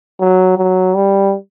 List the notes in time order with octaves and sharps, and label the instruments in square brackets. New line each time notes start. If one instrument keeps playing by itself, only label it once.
[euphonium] F#3
F#3
G3